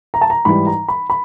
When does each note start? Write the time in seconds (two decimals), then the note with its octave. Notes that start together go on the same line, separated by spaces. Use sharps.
0.14 A#5
0.21 A5
0.30 A#5
0.45 G#2 E3 G3 B5
0.67 A#5
0.88 B5
1.10 B5